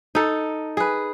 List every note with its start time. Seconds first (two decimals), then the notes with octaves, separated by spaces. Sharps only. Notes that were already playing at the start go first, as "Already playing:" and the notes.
0.15 D#4 A4
0.77 G#4 B4